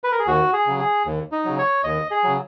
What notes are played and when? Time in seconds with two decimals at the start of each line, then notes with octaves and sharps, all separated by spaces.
0.04 B4
0.12 A#4
0.19 G#4
0.27 D#2 F#4
0.53 G#4
0.67 C#3 F#3
0.79 G#4
1.06 D#2
1.32 D#4
1.45 C#3 F#3
1.58 C#5
1.84 D#2 D#5
2.11 G#4
2.24 C#3 F#3